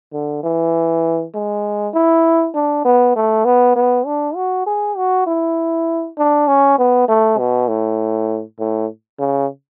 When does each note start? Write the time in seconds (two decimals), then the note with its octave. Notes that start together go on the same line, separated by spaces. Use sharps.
0.13 D3
0.43 E3
1.35 G#3
1.94 E4
2.55 D4
2.85 B3
3.16 A3
3.45 B3
3.76 B3
4.06 D4
4.35 F#4
4.66 G#4
4.97 F#4
5.27 E4
6.18 D4
6.47 C#4
6.78 B3
7.08 A3
7.39 B2
7.68 A2
8.59 A2
9.19 C#3